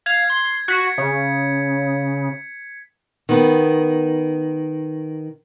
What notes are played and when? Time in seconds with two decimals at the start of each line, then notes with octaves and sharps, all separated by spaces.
0.06 F5 G#6
0.30 C6
0.68 F#4 B6 C#7
0.98 C#3
3.29 D#3 B3